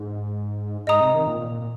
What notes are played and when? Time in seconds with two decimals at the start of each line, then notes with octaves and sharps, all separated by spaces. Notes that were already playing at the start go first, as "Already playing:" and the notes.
Already playing: G#2
0.87 G#2 D#5 A#5 D#6
1.00 C3
1.14 D#3
1.27 A#2
1.40 A#2
1.61 A#2